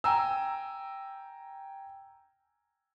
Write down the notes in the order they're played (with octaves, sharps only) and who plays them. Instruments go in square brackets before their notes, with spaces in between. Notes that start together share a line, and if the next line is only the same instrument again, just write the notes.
[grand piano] G5 G#5 A#5 E6